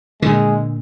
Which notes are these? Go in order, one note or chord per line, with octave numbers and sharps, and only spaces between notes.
A#2 D3 G#3